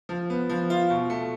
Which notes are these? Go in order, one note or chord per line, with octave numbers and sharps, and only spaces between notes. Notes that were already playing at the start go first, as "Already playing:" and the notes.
F3
B3
F3
F4
B2
A3